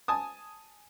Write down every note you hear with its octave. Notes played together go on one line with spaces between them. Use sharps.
G#5 A5 D#6